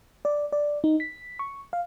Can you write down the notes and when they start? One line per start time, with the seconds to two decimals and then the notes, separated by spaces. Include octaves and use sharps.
0.25 D5
0.52 D5
0.84 D#4
1.00 B6
1.39 C#6
1.73 F5